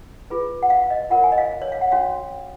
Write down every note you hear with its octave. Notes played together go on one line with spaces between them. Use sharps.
F4 G#4 B4
F#5
F5
F5
D#5
F4 A#4 C#5 F#5
G#5
D#5
F5
C#5
F5
F#5
C#4 F#4 C#5 F5